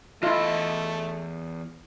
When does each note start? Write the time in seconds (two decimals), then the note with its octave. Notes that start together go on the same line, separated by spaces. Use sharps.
0.23 E2 A3 E4 F4 D#5